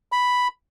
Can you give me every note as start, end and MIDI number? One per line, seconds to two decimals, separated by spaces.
0.12 0.48 83